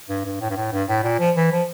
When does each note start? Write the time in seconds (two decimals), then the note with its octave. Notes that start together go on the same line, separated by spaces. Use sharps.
0.09 G2
0.25 G2
0.41 A2
0.50 G2
0.57 A2
0.73 G2
0.89 A2
1.04 A#2
1.19 F3
1.36 E3
1.52 F3